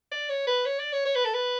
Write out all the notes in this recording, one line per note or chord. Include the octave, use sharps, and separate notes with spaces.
D5
C#5
B4
C#5
D5
C#5
C#5
B4
A4
B4